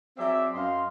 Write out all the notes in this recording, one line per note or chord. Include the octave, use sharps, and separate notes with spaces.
F#3 C4 G#4 D5 E5
F#2 D#5 F5 C6